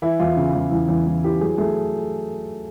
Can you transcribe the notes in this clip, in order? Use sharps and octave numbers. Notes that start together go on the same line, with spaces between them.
E3 E4
E2 F4
C#3
E2
E2
E2
E2
E3 G4
F#3 G#4
A3 G#4